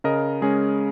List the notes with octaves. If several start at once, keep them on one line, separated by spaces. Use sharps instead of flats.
C#3 A#4 D#5
G#3 C#4 G#4